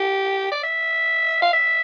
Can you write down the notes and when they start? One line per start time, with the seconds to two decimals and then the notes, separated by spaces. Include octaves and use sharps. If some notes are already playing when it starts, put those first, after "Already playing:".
Already playing: G4
0.52 D5
0.63 E5
1.42 F5
1.53 E5